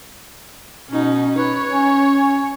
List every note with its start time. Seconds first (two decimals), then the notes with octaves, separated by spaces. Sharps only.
0.90 B2 C#4 D#4
1.38 B4 C#5
1.71 C#4